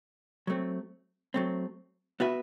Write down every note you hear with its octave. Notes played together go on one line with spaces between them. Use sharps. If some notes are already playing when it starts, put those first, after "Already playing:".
F#3 A3 C4
F#3 A3 C4
B3 F#4 B4 E5